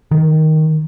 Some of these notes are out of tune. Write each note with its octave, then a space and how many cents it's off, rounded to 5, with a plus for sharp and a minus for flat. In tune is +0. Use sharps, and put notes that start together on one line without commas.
D#3 +5